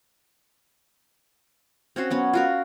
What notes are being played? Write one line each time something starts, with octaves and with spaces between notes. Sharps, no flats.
C4 C#4 F#4 C5
F#3 B3 C#4
F4 F#4 A#4